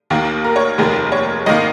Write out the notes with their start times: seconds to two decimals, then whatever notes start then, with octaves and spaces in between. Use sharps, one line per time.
0.10 D#2 D#3 A#3
0.44 A#4
0.56 C#5
0.78 F1 D#2 D#3 G#3 A#4
1.12 C#5
1.46 G#1 D#3 A#3 D#5